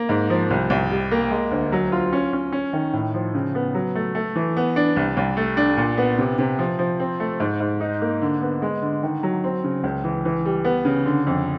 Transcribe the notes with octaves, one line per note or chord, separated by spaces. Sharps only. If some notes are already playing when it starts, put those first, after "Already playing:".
Already playing: A#3
G#2
F3
C2
C2
G3
A#3
G#3
D2
F#3
F4
C#4
C#4
C#4
D#3
A2
F3
C#3
B3
F#3
A3
A3
E3
B3
D4
C2
C2
A3
D4
A#2
B3
C3
C3
F3
F3
C4
A3
G#2
G#2
D#4
A#3
D3
B3
G#3
D3
D#3
F#3
C4
C#3
C#2
E3
E3
G3
B3
C#3
D3
F2